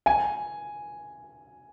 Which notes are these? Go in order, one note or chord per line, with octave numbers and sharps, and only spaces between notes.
G#5